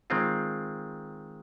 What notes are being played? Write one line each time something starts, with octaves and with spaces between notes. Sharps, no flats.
D#3 G#3 C4 F4